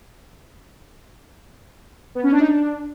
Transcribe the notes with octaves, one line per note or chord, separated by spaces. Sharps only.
B3
C#4
D4
D#4
D4